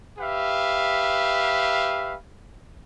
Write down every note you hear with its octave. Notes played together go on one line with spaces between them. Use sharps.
G4 B4 E5 F5